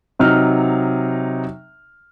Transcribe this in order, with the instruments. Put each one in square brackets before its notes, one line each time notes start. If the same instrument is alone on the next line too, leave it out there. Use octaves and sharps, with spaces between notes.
[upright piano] C3 F#3 D#4 F6